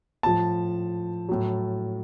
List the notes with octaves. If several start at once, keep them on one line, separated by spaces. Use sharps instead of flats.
A2 F3 A5
A2 F#3